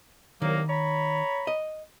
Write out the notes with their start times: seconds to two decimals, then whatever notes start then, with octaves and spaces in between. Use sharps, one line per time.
0.42 C2 D#3 F#3 A#3
0.69 C#5 A#5 B5
1.47 D#5